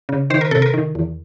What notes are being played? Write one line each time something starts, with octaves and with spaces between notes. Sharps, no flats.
C#3
D#3 C5
A#4
C3 A4
A#4
D#3
E2